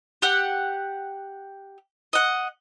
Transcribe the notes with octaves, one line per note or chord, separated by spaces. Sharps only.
G4 F#5
D#5 F#5